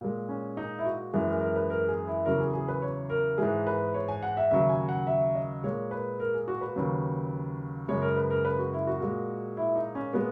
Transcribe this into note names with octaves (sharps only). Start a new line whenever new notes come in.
A#2 G#3
C#4
D#4
E4
F#4
F#2 E3 G#3 G#4
A#4
A#4
B4
A#4
G#4
E4
E2 C#3 F#3 A#4
G#4
G#4
B4
C#5
A#4
G#2 E3 G#3 G#4
B4
C#5
G#5
F#5
E5
D#2 C#3 F#3 E5
G#5
F#5
E5
D#5
A#2 G#3 C#5
B4
A#4
G#4
F#4
B4
D#2 C#3 F#3
F#2 C#3 G#3 C#5
A#4
B4
A#4
B4
F#4
E4
F#4
A#2 G#3
E4
D#4
C#4
A#2 G#3 B3